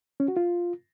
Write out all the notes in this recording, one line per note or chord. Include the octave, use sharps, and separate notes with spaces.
C#4
F#4
F4